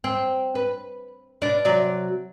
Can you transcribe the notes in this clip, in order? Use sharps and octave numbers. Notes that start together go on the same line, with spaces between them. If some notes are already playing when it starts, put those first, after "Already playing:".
C4
B4
B2 D4
C3 F#3 D5